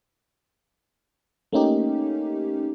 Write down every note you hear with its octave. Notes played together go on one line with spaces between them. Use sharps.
A3 A#3 C#4 D#4 G4